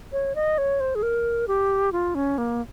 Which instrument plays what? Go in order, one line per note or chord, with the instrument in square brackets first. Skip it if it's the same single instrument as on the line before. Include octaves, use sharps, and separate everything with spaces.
[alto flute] C#5
D#5
C#5
C5
G#4
A#4
G4
F4
C#4
A#3